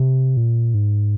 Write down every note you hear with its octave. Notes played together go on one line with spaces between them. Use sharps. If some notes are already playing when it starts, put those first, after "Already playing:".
Already playing: C3
A#2
G#2